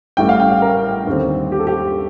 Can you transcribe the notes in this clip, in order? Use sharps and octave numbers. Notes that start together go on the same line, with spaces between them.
A1 A2 G3 G5
F5
G5
F5
A#4
D#2 D3 G3 C4
G4
A4
G4